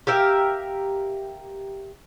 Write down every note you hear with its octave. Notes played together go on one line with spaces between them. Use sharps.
G4 A#4 E5 F5